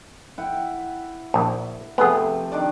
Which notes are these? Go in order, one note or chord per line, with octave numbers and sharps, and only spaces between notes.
E4 F#5 G5
A#1
C3 F3 A3 B3 G#4
D#3 D4 D5